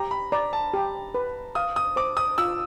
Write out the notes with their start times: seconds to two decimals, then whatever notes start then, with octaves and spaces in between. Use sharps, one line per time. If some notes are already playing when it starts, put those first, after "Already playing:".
Already playing: G4 A#5
0.11 B5
0.32 D5 A#5
0.53 A5
0.74 G4
1.15 B4
1.55 F5 D#6
1.76 D#6
1.96 C5 D6
2.17 D#6
2.38 F4 E6